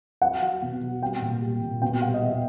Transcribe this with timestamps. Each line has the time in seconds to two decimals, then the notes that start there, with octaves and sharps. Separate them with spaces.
0.22 F#3 F#5
0.42 F#3
0.62 B2
0.82 F#3
1.02 G3 G5
1.22 A#2
1.41 G3
1.61 A#2
1.82 B2 G5
2.02 G3 F#5
2.14 D#5
2.22 B2 E5